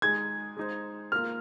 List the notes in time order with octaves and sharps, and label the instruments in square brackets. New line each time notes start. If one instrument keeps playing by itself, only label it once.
[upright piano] G#3 D#4 G#4 [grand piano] G#6
[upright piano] G#3 D#4 C5
[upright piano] A#3 F4 A#4 [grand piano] F6